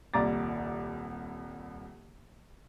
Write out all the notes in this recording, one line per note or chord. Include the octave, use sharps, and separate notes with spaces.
D#1 C2 A#5 D6 A6